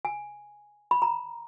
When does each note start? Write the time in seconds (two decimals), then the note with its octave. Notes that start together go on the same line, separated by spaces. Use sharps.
0.05 G#5
0.91 B5
1.02 A#5